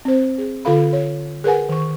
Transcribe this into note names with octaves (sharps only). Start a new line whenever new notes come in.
C4 C5
G#4
D3 F4 A4 F5 B5
C#5
G#4 A#4 B4 F#5 G#5
D#3 C#6